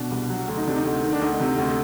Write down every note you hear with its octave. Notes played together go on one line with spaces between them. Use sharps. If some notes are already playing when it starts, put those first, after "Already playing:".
Already playing: B2 D4
C2
F#3
D2
D#4
C3 D4
D#4
D2
D#3
D4
D2 D#4
C3
D2